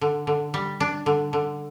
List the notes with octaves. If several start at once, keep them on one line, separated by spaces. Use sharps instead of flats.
D3
D3
G3
D4
D3
D3